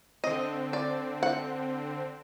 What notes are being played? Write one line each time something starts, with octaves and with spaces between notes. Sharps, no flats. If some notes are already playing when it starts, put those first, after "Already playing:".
D3 C4 D#5
D5
F#5